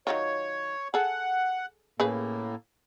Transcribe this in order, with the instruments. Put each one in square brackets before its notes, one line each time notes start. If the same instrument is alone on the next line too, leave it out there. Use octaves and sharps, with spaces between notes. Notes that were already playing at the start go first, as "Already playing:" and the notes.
[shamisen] D#3 F#3 F4 [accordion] C#5
[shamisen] G#4 A4 [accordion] F#5
[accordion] A2 A#3 [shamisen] C#3 G#4 B4